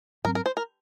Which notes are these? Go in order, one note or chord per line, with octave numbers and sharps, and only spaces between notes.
G#2 F#3 C4 A#4
A#4
C5
A#4